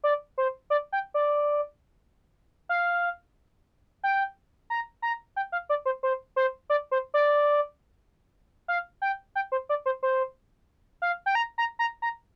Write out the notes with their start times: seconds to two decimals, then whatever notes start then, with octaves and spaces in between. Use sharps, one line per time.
0.04 D5
0.38 C5
0.70 D5
0.93 G5
1.14 D5
2.69 F5
4.03 G5
4.70 A#5
5.02 A#5
5.36 G5
5.52 F5
5.69 D5
5.85 C5
6.03 C5
6.36 C5
6.70 D5
6.91 C5
7.14 D5
8.68 F5
9.02 G5
9.35 G5
9.52 C5
9.69 D5
9.86 C5
10.03 C5
11.02 F5
11.26 G5
11.35 A#5
11.58 A#5
11.79 A#5
12.02 A#5